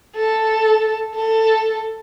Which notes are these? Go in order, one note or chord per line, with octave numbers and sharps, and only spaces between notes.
A4
A4